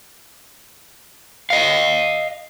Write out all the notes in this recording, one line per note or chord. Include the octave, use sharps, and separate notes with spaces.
D#5 F5